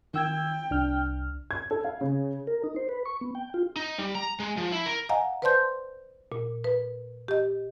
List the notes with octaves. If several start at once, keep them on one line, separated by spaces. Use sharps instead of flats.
D#3 G5 E6 G#6
C2 D4 F6
G#6
A4
F5
C#3
A#4
D#4
C5
B4
C#6
B3
G5
F4
D#4
G3
A#5
G#3
F3
E4
A#4
D#5 F5 F#5 G#5 A#5
B4 C5 D5 A5 C6 G6
A#2
B4
G4 D#5